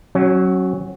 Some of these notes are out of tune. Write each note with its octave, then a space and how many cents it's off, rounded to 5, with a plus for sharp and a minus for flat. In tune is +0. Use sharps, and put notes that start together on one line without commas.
F#3 +10 C#4 -20